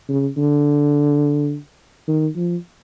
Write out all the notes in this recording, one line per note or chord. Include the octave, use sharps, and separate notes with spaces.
C#3
D3
D#3
F3